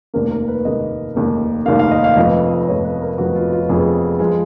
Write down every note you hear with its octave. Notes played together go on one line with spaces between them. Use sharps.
F1 D#2 D#3 A#3 A#4
A#4
B4
F1 D#2 D#3 A#3 D#5
F1 D#2 D#3 A#3
F1 D#2 D#3 A#3 F5
F5
D#5
F5
F1 F2 F3 B3 D#5
F1 F2 F3 B3 C#5
B4
A#4
F1 F2 F3 B3 F#4
F4
F4
F1 F2 F3 B3 G#4
F3 G#3